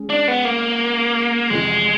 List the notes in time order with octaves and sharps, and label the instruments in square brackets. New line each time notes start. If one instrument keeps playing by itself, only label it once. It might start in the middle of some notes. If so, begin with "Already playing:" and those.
Already playing: [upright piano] G#3 C#4
[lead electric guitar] D4
B3
A#3
[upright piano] F2 C3 E3 [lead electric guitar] G#3